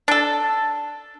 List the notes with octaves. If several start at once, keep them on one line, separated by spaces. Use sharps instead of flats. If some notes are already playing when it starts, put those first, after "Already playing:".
D4 A4